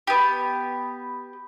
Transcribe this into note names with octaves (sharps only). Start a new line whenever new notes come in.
B3 G4